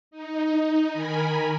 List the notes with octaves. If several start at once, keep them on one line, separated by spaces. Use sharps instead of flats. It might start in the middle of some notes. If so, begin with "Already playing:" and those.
D#4
D#3 A#4 G#5 B5